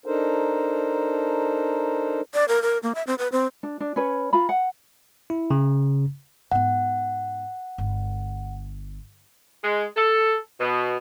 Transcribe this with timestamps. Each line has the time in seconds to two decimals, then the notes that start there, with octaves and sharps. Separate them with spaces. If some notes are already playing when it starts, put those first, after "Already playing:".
0.06 D4 D#4 A4 A#4 C5
2.34 D5
2.48 A#4
2.62 A#4
2.83 A#3
2.95 E5
3.07 C4
3.18 B4
3.32 C4
3.63 D4
3.80 D4
3.96 C#4 B4 C#5
4.33 F4 A#5 B5
4.49 F#5
5.30 E4
5.51 C#3
6.52 G#2 B3 F#5
7.78 G1
9.63 G#3
9.96 A4
10.60 B2